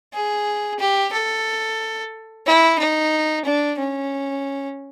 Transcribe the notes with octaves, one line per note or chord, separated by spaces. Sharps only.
G#4
G4
A4
E4
D#4
D4
C#4